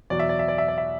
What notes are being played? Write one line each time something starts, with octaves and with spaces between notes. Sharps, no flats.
E2 B2 F#3 D5
E5
D5
E5
D5
E5
D5
E5